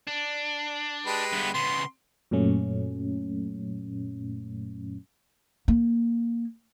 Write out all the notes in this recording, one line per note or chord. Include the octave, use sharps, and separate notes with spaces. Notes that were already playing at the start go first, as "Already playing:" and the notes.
D4
G#3 G4 B4
G2 B3
C#3 B3 C6
F#2 A#2 F#3 A3 C#4
A#3